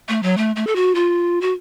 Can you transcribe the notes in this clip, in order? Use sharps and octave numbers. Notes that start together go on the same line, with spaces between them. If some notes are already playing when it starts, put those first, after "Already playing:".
A3
F#3
A3
A3
A4
F#4
F4
F#4